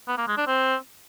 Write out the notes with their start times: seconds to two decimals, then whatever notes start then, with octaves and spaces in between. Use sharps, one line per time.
0.08 B3
0.17 A#3
0.27 G#3
0.37 D4
0.47 C4